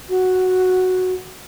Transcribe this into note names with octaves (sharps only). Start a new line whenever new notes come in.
F#4